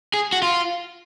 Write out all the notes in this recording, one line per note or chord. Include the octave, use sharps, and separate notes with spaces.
G#4
F#4
F4